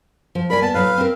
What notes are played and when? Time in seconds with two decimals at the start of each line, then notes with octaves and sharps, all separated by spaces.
0.35 F3
0.50 A#4 D5 G#5 B5
0.62 B3 A5
0.74 A2 F#3 B4 F5
0.97 C4 A#4